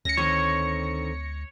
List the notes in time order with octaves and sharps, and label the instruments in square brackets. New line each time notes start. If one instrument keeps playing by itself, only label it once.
[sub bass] D2 [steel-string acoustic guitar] C#4 [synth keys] A#6 C#7
[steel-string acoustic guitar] D3 D#3 C4 [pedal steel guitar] C#5